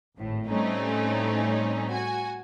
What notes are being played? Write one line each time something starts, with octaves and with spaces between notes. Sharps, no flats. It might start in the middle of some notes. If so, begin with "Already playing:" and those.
G#1 A2
A2 G3 A3 C4 C#4 D#4
F#4 G#5